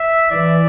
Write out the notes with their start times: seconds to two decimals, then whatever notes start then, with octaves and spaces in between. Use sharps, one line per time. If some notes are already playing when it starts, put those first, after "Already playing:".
Already playing: E5
0.32 E3 D5